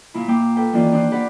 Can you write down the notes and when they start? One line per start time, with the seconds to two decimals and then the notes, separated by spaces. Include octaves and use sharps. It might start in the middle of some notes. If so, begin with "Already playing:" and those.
0.14 A#2 A#3 E4 B5
0.28 A#3 F5 G5 D6
0.56 A4 B4 G5
0.73 D#3 E3 A#3 C#4 F4 D5
0.92 D4 C5 D#6 F#6
1.12 F4 G4 B4 D5 F#5